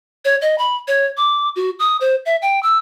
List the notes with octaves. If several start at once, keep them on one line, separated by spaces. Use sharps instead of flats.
C#5
D#5
B5
C#5
D6
F#4
D#6
C5
E5
G5
E6